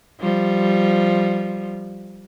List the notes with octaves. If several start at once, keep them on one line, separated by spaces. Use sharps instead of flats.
F3 G3